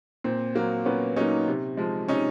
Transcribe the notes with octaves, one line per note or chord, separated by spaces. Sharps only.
A#2 C4
F#3 A#3
A#2 B3 C#4
F#3 A#3 C#4 D#4
C3
F3 G#3
C3 C#4 D#4